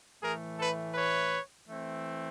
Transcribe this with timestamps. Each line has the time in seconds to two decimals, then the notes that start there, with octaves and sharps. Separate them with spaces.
0.23 A2 E3 A3 G#4 A#4
0.59 A4 B4
0.94 B4 C#5
1.66 E3 A3 C4